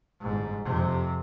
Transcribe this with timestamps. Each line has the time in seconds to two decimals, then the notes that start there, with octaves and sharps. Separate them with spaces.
0.20 G1 G#2
0.64 F2 C3